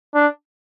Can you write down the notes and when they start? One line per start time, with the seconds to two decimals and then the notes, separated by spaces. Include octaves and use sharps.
0.15 D4